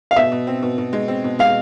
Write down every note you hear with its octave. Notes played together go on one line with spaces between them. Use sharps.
F5
B2 E5
B2
C4
B2
B2
G#3
C4
B2
G#3 F5